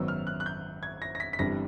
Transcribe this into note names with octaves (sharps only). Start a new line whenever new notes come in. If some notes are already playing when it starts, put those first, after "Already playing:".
Already playing: G#1 F#2 D#3 F#3 B3 E6
F6
F#6
F#6
G6
G#6
A#6
A#6
B6
B6
G1 G2 E3 G3 C4 A#6